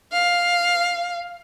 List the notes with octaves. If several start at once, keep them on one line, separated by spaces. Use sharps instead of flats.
F5